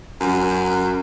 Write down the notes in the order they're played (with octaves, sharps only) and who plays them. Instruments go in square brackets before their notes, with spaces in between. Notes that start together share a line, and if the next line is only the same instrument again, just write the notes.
[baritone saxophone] F#2